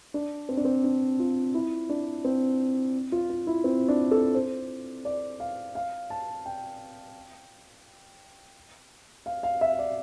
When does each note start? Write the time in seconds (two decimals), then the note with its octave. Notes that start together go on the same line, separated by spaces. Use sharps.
0.14 D4
0.49 C4
0.57 D4
0.65 C4
0.84 D4
1.19 F4
1.54 E4
1.89 D4
2.25 C4
3.12 F4
3.30 F4
3.47 E4
3.64 C4
3.88 D4
4.11 A4
4.35 C5
5.05 D5
5.40 F5
5.75 F5
6.10 A5
6.46 G5
9.26 F5
9.43 F5
9.61 E5
9.79 D5